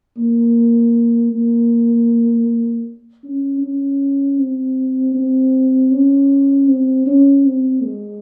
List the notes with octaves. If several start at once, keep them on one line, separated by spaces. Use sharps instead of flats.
A#3
A#3
C#4
C#4
C4
C4
C#4
C4
C#4
C4
G#3